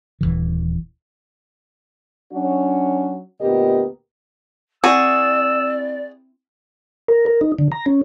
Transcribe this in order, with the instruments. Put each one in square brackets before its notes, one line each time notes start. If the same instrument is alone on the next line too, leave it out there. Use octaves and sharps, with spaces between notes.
[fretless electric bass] D#1 C#2 E3
[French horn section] F#3 C#4 D4 F#4
D2 A#2 B3 G4 A#4 D#5
[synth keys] C4 E4 [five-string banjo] F#4 G#4 [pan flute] D5 [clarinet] E6
[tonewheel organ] A#4
A#4
D#4
D3
A#5
C#4